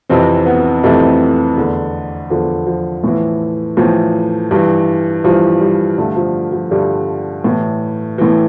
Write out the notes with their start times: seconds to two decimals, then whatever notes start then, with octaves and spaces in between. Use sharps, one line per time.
0.09 F2 C3 E3 C4
0.46 B3
0.83 F2 C3 E3 A3
1.57 E2 D3
2.30 E2 D3 F3
2.67 F3
3.04 A2 E3
3.77 A2 E3 F3
4.51 G2 E3
5.24 G2 E3 F3
5.61 G3
5.98 G2 D3 A3
6.16 F3
6.52 F3
6.71 G2 D3 G3
7.44 A2 E3
8.18 A2 E3